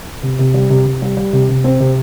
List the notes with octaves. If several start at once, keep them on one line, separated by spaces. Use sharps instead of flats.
C3
C3
G3
C3
C3
G3
G3
C3
C3
C4
C3